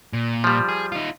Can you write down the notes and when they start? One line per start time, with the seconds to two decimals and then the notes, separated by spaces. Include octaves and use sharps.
0.13 A#2
0.44 F3 G3
0.69 G#4
0.92 D#4 F4